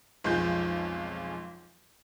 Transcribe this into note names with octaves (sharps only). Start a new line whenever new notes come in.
B1 F2 G#3 F4 G6